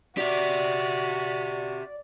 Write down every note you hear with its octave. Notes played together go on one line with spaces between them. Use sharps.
F#4 G4 D5 E5